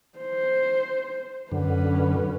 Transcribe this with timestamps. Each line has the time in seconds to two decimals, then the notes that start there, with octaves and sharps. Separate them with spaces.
0.18 C5
1.52 F#2 D3 C#4 B4